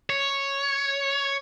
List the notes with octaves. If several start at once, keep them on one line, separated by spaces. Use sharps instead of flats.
C#5